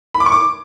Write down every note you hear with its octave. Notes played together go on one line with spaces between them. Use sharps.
B5
D6
C#6
D6